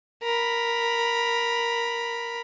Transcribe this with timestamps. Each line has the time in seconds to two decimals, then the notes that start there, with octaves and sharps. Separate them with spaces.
0.23 A#4 B5